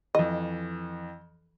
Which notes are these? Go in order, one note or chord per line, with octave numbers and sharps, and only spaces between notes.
F2 E3 D#5